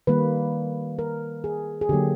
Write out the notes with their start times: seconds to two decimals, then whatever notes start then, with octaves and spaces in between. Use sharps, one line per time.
0.07 D#3 G3 A#3 B4
0.99 A#4
1.44 G#4
1.81 G#4
1.89 D3 F#3 A#3 G4